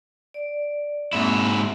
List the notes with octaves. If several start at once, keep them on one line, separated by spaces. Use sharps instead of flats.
D5
G#2 A#3 C4 E4 F#4